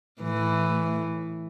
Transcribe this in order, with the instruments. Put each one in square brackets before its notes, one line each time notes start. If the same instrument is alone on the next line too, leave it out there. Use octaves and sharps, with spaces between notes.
[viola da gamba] A2 E3